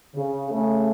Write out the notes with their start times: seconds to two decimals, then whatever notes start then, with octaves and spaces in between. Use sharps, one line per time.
0.15 C#3
0.51 C#3 A3